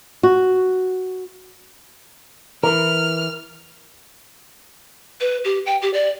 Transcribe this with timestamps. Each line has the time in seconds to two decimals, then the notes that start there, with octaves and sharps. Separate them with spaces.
0.23 F#4
2.63 E3 A#4 F6
5.21 B4
5.45 G4
5.66 G5
5.82 G4
5.94 D5